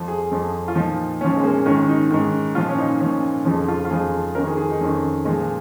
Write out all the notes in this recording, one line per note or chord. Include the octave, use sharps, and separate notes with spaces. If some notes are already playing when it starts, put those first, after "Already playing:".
Already playing: F2 F3
G#4
F2 F3
F4
A#2 F3 D#4
A#2 F3 C#4
G#3
A#3
G#2 D#3 C#4
D#4
G#2 D#3
A#2 F3 F4
C#4
D#4
A#2 F3 C#4
F2 C#3 F3 D#4
F4
F4
F2 C#3 F3 G#4
F2 D#3 A#4
G#4
G#4
D#4
F2 D#3 C#4
A#2 F3 G#3